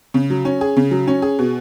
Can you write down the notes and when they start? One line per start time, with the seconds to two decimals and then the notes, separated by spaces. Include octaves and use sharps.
0.14 C#3
0.30 F#3
0.45 C#4
0.61 G#4
0.77 C#3
0.91 F#3
1.07 C#4
1.22 G#4
1.39 B2